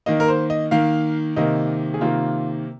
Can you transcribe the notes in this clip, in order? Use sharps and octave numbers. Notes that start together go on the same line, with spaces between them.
D#3 A#3 D#5
A#4
C5
D#5
D#3 A#3 F5
C3 D#3 A#3 D#5
G#4
C3 D#3 A#3 F4